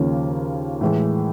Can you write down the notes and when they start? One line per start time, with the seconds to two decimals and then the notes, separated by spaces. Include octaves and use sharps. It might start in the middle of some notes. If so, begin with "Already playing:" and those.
Already playing: D#2 C#3 F3 A#3 C#4
0.81 A2 E3 G#3